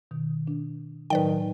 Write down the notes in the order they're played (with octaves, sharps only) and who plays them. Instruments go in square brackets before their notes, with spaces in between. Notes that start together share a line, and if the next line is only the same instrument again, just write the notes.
[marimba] B2 D#3
D4
[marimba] A2 F#3 [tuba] D#3 [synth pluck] B4 D5 G5